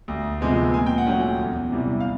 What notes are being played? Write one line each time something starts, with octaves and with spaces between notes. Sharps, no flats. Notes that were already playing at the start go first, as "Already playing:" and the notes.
D2
C3 F3 G#3 B3
A#2 G#5
G5
F#5
F#3 A3 C#4 G5
E2
C3 E3 G3
F5